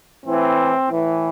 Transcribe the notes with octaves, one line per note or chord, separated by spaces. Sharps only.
A2 E3 C4
A2 E3